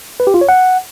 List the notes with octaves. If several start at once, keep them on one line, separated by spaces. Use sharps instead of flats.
B4
G4
F4
C#5
F#5